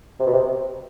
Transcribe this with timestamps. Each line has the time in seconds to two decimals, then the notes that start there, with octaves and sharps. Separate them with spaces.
0.20 C3
0.27 B2
0.33 C3